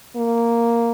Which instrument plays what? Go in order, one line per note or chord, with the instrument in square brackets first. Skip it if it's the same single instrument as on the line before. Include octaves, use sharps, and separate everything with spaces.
[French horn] A#3